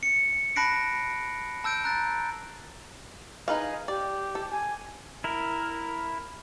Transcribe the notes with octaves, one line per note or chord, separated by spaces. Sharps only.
C#7
A5 B5 F#6 A#6 C7 D7
A5 E6 G6 D7
A#5 F#6 A6
D#4 G#4 B4 D#5 F5
G4 D5
A4
G#5
E4 A#4